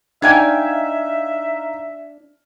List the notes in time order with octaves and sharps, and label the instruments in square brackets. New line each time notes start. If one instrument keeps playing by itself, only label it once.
[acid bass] D4 [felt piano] D#4 F5 G#6 [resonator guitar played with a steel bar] C#5 G5 G#5 [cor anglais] E5